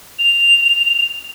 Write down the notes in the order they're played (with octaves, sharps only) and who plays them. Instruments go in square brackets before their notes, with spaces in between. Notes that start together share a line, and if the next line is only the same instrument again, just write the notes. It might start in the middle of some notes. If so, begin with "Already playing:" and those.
[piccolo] F7